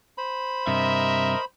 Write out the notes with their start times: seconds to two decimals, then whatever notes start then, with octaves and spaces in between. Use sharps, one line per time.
0.18 C5 B5
0.67 G2 C3 A#4 D#5 E5